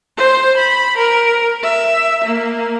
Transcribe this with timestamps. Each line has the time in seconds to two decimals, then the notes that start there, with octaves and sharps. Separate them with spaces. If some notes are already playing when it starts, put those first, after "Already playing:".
0.17 C5
0.57 B5
0.97 A#4
1.62 E5
2.24 A#3